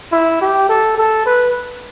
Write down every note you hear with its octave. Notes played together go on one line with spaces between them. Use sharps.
E4
G4
A4
A4
B4